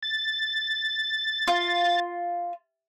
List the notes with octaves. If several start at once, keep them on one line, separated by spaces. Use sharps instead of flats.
A6
F4